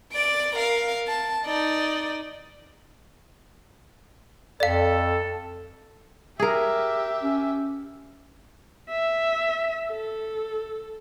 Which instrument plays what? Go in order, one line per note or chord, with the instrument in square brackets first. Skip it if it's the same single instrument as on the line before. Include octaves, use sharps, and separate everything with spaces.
[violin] D5 D7
A#4 F5
A5
D#4 D5
[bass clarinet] F2 [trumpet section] A4 [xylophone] D5 F5
[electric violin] G4 E5 [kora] G#4 A#4
[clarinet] C#4
[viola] E5
A4